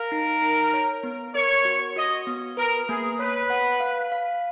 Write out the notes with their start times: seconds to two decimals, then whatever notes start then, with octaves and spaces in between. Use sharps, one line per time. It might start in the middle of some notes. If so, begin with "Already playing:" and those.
Already playing: A#4 F5
0.12 D#4
0.42 D#4
0.73 C#5
1.03 B3
1.35 A#4 C#5
1.65 F#4
1.96 F#4 D#5
2.27 B3
2.57 A#4 B4
2.89 A#3 G#4
3.19 B4 C#5
3.50 F#5
3.80 F5
4.12 F5